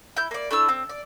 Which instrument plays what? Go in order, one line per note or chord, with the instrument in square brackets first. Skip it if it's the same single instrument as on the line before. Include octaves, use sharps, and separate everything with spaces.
[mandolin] E4 G6
A#3 D5
A3 D4 E4 E6
C4
D5